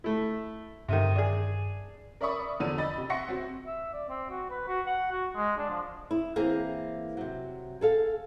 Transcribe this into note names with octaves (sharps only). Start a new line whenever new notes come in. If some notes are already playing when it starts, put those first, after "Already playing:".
A3 E4
G2 C3 D#3 D#7
D4 G#4
A#4 D5 E5 B5 C#6 D#6
E2 D3 F3 D5 E6 D#7
D#5 B5 A6
C3
E5 F#5 C6 C#6 A#6 C#7
C4 F#4
E5
D5
C4
F#4
B4
F#4
F#5
F#4
G#3
D4
F3
E4
E3 A#3 C4 G#4 A#4
C3 F#3
G#4 A4 F5